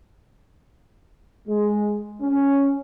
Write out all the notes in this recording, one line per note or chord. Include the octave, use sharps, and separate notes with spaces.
G#3
C#4